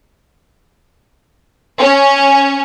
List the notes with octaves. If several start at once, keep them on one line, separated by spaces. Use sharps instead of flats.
C#4